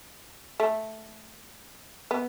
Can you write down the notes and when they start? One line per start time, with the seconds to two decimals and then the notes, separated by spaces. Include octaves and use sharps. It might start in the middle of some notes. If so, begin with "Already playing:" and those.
0.60 A3
2.11 B3